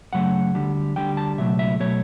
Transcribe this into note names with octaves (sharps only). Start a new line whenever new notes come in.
F#2 C#3 F#3 A3 F#5
D2 D3 G3
D2 D3 G3 G5
A5
C#2 B2 F#3 A3 E5
E5
B2 F#3 A3 C#5